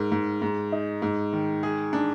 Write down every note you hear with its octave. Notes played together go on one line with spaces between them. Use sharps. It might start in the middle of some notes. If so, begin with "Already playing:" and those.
Already playing: G#2 A#4
G#2
G#2
D#4
G#2
D#3
G#4
D4